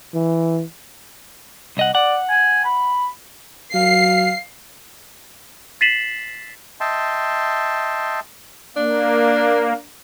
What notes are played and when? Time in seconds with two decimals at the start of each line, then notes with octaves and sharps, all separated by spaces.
0.14 E3
1.77 C2 D#5 F#5
1.95 D5 F#5
2.30 G#5
2.65 B5
3.74 F#3 F5 C7
5.81 A6 B6 C7 D#7 E7 F#7
6.80 D#5 E5 G5 A5 C6
8.77 A#3 D4